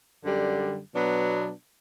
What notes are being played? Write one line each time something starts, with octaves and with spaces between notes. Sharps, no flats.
F#2 D3 G3
B2 F#3 B3 D4